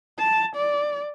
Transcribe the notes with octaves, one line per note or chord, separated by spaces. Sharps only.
A5
D5